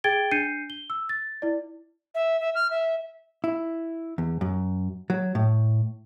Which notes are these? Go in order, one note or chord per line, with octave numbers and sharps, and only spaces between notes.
G#4 G5 G#6 A6 D7 G7
D4 G6 C7 C#7 D#7
G7
E6
A6
E4 D5
E5
E5
F6
E5
E4
E2
F#2
F#3
A2